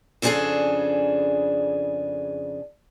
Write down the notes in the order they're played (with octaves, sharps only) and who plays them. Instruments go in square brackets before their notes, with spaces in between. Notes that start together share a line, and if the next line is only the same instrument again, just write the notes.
[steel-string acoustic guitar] F2 C#3 D4 D#4 G#4 A4